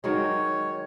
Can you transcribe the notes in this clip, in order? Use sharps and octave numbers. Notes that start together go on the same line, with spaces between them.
D#3 F#3 G#3 C#5